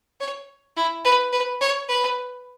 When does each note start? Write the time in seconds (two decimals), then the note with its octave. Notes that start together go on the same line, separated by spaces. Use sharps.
0.20 C#5
0.77 E4
1.05 B4
1.32 B4
1.61 C#5
1.88 B4